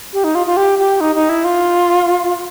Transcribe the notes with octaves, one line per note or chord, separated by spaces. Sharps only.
G4
D#4
F4
F4
G4
G4
D#4
D#4
E4
F4